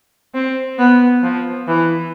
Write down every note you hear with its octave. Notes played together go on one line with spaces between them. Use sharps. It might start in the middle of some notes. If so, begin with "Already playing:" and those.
C4
B3
F3
E3